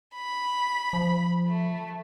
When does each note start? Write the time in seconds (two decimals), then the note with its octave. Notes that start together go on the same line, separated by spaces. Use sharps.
0.15 B5
0.93 F3
1.48 A3